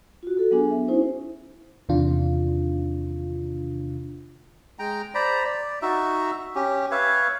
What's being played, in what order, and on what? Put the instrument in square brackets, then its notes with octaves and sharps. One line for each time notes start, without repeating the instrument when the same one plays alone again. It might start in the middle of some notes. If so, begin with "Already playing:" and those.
[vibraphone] F4 F#4
F#4 A4
F#3 B3 D4 G#4 G#5
E5
C#4 D#4 E4 C5
[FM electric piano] E2 C3 D#3 D4 F4
[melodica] G#3 G5 A#5
C5 D5 A#5 B5
D5
D#4 F#4 E5
C#4 G4
B4 C#5 E5 F5